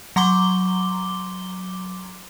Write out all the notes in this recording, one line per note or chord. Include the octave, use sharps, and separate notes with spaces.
F#3 A#5 C6 D6 G7